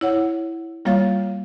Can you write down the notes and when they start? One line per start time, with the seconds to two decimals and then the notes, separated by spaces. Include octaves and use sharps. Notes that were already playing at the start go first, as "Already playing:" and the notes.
0.01 E4 C#5 F#5
0.85 G3 A#3 F4 C#5 F5 A6